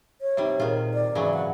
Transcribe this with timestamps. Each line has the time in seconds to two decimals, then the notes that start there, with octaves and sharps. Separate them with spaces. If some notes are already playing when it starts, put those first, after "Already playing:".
0.21 C#5
0.37 C3 G3 D#4 E5
0.60 A#2 D#3 D#4 F4 G#4
0.94 D5
1.15 G#2 C#3 E3 F#3
1.33 F#5